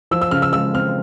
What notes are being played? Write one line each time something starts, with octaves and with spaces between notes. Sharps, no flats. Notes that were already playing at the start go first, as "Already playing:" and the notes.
F3 E6
E6
C#3 F6
E6
G#3 E6
C4 F6